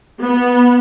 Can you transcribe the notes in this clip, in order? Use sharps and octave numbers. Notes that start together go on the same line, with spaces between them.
B3